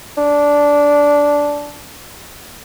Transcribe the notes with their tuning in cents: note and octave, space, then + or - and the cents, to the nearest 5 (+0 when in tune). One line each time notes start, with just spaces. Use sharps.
D4 -10